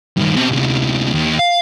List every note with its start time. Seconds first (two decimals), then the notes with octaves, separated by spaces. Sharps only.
0.17 G2 D#3
0.35 B2 C4
0.52 D2 C3
1.11 D#2
1.39 F5